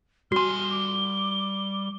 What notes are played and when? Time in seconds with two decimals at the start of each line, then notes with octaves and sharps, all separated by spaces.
0.32 G3 F#4 G#5 C6 F6 G7
0.70 D6